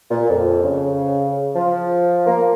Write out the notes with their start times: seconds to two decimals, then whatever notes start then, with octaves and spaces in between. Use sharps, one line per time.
0.10 A#2
0.29 F2
0.63 C#3
1.55 F3
2.26 A#3